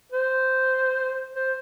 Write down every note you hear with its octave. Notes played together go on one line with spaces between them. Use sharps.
C5
C5